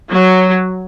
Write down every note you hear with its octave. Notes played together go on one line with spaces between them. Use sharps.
F#3